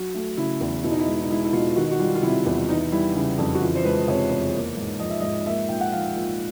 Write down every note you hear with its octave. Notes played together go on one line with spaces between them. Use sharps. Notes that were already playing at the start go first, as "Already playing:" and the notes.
Already playing: F#3 F#4
A3
C#3 E4
E2 E4
B2 E4
D#4
E4
G#3
D#4
G#3 E4
E4
B2 F4
D#3 F#4
F#4
G3 F4
F4
C3 E4
E2
E3 D#4
G3 E4
C#3
F2
F#4
E3 F4
C5
G#3 B4
C3 C#5
E2
A#3
G#2
F3 D#5
E5
G#2 D#5
A#3 E5
A#2 G5
F#5
F3 F5
A#2